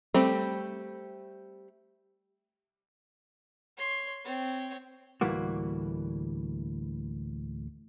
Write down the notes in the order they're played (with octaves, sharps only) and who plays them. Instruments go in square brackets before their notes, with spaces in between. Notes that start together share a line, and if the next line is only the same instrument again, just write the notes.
[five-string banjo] G3 A3 C4 G4
[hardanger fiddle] C#5 C6
C4 C#5
[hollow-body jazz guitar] D2 A2 E3 G3 A#3 F#4